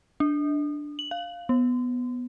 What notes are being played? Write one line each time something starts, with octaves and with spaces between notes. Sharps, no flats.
D4
F#7
F5
B3